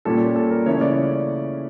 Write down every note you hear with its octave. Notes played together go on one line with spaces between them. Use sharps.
A#2 G3 C#4 A4
A4
A#4
C#3 E3 A3 C#4 C#5
D5